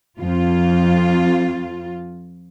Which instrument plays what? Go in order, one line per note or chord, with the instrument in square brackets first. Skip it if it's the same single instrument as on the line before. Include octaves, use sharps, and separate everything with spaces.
[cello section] F2 F4